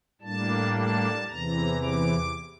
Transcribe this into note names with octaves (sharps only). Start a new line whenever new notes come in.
A2 G3 A#3 D4 A5
A5
E2 C3 E3 A#5
D6